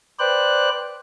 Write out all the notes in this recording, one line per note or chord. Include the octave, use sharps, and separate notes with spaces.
B4 C5 D5 G5 F#6